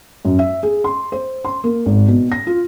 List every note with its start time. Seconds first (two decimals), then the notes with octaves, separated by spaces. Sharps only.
0.25 F#2
0.39 E5
0.63 G#4
0.84 C6
1.12 C5
1.45 C6
1.64 A#3
1.86 G#1
2.08 B2
2.32 A#6
2.47 F4